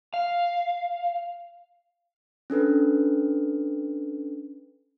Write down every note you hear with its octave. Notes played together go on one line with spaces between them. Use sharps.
F5
C#4 D4 A4 B4